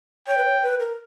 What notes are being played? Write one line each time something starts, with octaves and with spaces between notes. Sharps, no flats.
C#5 G5
B4
C#5
B4
A#4